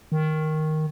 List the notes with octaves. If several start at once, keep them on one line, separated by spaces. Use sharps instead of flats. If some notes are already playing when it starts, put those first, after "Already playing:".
D#3